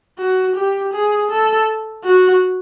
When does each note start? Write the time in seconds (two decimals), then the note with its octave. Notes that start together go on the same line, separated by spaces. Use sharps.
0.18 F#4
0.55 G4
0.93 G#4
1.30 A4
2.04 F#4